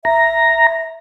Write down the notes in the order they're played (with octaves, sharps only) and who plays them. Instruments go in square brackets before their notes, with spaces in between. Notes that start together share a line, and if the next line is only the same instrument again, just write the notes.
[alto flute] E5 [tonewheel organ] A#5